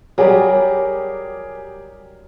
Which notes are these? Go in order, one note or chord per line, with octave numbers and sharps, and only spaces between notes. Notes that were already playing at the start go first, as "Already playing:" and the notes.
F#3 G3 G4 G#4 A#4